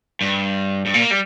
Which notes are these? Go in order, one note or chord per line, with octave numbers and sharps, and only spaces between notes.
G2
G2
A#2
A#3
G3